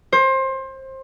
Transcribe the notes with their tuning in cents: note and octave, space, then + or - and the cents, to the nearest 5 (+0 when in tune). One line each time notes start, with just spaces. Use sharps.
C5 +25